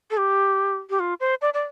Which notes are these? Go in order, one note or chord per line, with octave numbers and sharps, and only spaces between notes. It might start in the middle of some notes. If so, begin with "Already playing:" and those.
A4
G4
G4
F4
C5
D5
D5